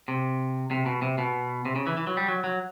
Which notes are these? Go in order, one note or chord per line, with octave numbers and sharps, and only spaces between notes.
C3
C3
B2
C3
B2
C3
C#3
E3
E3
F#3
G3
F#3
F#3